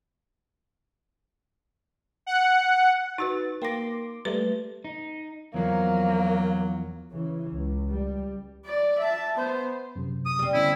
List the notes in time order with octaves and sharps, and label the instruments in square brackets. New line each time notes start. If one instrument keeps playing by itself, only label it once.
[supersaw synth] F#5
[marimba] D#4 F#4 B4 [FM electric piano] A6
[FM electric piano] A#3 C6 D6 [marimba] G5 A#6
[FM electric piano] G3 A3 [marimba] B4
[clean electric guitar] D#4
[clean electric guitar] E2 F3 [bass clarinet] F#3 [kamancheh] A#3
[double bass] C#3 E3
C#2
G3
[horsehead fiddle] D5
E5 A5
B3 C5
[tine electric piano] F#2 C3
[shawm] D#6
[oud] G3 C4
[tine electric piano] D3 B3 C#4 [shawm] E4